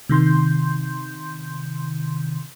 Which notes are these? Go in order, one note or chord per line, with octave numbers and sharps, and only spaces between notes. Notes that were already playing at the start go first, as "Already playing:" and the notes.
C3 D#3 C6 G6